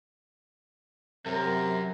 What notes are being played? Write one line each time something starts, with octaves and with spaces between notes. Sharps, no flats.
F#2 C3 A#4